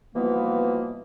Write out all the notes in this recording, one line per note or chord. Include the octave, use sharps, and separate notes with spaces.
B2 E3 F3 G3 A#3 B3